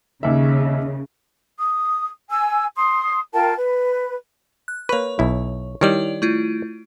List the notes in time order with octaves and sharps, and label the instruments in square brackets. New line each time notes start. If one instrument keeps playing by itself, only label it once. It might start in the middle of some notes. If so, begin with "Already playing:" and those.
[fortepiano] D#2 E5 [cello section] C#3
[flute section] D#6
G#5 E6
C6 D#6
F4 A#4 G5 A5
B4
[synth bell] F#6
[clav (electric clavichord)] A#3 B4 [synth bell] C#5 C#6
[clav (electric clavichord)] B1 E4
[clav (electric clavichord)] D#3 G3 [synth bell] E4 C#5 D5
[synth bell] A3 E4 F4